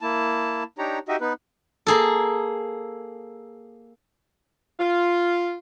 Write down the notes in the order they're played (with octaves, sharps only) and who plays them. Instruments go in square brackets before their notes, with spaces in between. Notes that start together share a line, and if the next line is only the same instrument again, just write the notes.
[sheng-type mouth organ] A#3 E4 A5
D4 D#4 G4 C#5 A#5
D#4 F#4 G4 D#5 E5
B3 D#4 B4
[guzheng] A#3 G#4 A4
[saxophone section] F4